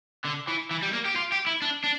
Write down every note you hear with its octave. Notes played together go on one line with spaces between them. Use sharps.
D3
E3
E3
G3
A#3
G4
F4
G4
E4
D4
D4